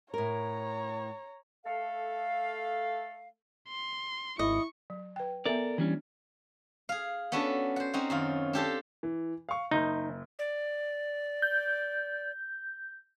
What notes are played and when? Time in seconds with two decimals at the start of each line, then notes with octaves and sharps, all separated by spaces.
0.14 A2 A#4 C#5 A#5
1.66 A3 A4 F5
3.68 C6
4.39 G#1 E4 D#5 C#6
4.90 F#3
5.16 B4 G5
5.46 B3 A4 A#4 D5 E5
5.78 E3 G3 C#4 D4
6.89 G#4 F5
7.32 B3 C#4 D4 F#4 A4
7.76 C5 F#5
7.93 C4 C#4 D#4 F#4
8.10 F#2 D#3 F4
8.53 D4 G4 A4 C5
9.03 E3
9.49 F5 C#6
9.71 F#1 D#4 G6
10.39 D5
11.42 G6